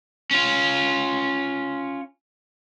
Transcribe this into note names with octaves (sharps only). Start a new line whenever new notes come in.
C#4 F4